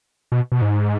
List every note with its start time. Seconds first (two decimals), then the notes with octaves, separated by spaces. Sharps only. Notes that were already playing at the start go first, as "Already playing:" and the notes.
0.32 B2
0.52 B2
0.62 G#2